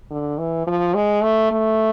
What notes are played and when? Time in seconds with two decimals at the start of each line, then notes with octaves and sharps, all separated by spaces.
0.11 D3
0.38 E3
0.67 F3
0.94 G#3
1.23 A3
1.51 A3